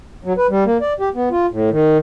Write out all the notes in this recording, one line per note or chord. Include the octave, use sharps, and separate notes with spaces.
F#3
B4
G3
A#3
D5
G4
B3
F4
A2
D#3